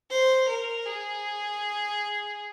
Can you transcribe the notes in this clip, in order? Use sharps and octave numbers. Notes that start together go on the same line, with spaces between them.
C5
A#4
G#4